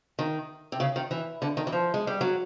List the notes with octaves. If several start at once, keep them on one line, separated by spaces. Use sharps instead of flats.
D#3
C3
C#3
D#3
E3
D3
D#3
E3
F3
G#3
G3
F#3